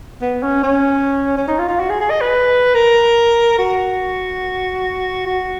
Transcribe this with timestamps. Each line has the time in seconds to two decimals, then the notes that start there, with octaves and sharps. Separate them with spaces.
0.21 B3
0.43 C#4
0.64 C#4
1.37 C#4
1.48 D#4
1.59 F4
1.69 F4
1.80 F#4
1.90 G#4
2.00 G#4
2.10 D#5
2.21 B4
2.74 A#4
3.58 F#4
5.26 F#4